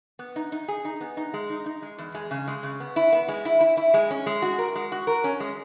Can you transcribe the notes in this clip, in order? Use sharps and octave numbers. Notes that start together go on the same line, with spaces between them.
B3
D#4
D#4
G#4
D#4
B3
D#4
G#3
D#4
D#4
G#3
E2
G#3
C#3
G#3
C#3
B3
E4
B3
G#3
E4
E4
E4
G#3
C#4
G#3
F#4
A#4
G#3
F#4
A#4
C#4
G#3